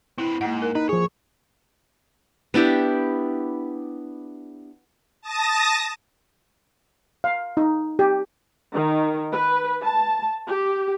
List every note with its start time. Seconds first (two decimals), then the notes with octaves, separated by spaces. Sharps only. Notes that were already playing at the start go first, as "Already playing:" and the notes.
0.18 C4 E4 B4
0.41 G#2 A#3 D#4 F#5
0.62 A#4
0.75 D#4 B4
0.89 F3 G#4 C#5
2.54 B3 D4 E4 G4
5.21 A5 D#6 A#6
7.24 F5
7.57 D#4
7.99 G4
8.74 D#3
9.33 B4
9.83 A5
10.48 G4